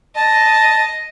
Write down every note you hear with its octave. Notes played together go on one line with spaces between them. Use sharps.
D#5 A5